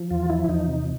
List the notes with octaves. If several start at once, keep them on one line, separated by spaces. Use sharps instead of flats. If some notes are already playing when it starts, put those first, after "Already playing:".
Already playing: F3
E2 F4
F3 E4
E2 D#4
C3